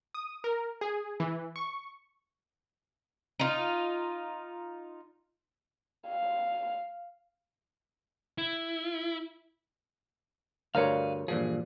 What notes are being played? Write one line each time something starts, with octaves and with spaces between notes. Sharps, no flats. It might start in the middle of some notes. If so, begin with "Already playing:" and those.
D#6
A#4
G#4
E3
C#6
D#4 F4
F5
E4
D2 G2 A#4 B4 C#5 D5 F5
G2 A#2 E3 F3 G#4